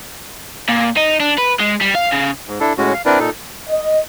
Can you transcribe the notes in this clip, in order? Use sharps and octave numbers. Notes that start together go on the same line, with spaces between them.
A#2
D#4
D4
B4
G#3
G3
F5
C#3
G#2
D4 E4 A4
A2 G#3 C#4 F#4
F5
C4 D4 E4 A#4 B4 D5
A#2 D#4 A4
D#5